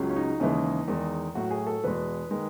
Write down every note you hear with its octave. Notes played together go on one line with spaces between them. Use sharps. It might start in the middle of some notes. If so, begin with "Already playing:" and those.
Already playing: C#2 C#3 F#3
C#4
D#4
D#2 C#3 E3 G#3
E2 D#3 G#3
A2 F#3 F#4
G#4
A4
E2 B2 G#3 B4
D#3 G#3